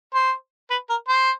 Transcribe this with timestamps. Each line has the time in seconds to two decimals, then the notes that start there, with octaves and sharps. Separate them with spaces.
0.14 C5
0.70 B4
0.90 A#4
1.08 C5